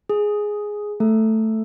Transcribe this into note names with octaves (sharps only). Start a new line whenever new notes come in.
G#4
A3 A4